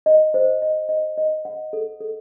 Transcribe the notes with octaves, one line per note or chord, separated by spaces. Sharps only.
D#5
C5
D#5
D#5
D#5
F#5
A4
A4